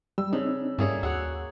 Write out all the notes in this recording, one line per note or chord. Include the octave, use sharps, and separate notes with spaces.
G3 E6
C#3 C4 D4 D#4
G#2 G3 A#3 C#4 E4 G#4 A4
D#2 F#4 G#4 C#5 D5 E6 F#6